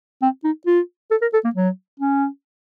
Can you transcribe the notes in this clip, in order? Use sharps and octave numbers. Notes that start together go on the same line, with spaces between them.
C4
D#4
F4
A4
A#4
A4
A#3
F#3
C#4